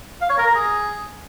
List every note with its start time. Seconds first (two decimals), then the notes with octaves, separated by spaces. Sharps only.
0.21 F5
0.30 C#5
0.38 A#4
0.47 A#5
0.55 G#4